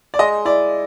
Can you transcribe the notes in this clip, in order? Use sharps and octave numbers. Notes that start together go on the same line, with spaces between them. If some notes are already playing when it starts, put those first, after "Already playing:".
D5
G#3 D#5
E4 D5